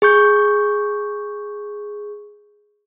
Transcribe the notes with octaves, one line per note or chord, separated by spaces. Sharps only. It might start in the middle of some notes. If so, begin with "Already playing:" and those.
G#4 C#6 G6